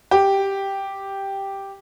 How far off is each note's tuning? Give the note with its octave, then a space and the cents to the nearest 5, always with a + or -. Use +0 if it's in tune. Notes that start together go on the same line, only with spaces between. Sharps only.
G4 +0